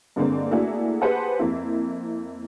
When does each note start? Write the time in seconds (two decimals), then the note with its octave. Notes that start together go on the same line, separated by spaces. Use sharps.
0.16 G2 D3 G#3 A#3 C4
0.51 A3 A#3 D4 E4 F#4 G#4
1.01 G4 G#4 B4 C5 F#5 A5
1.39 F2 A#3 C4 E4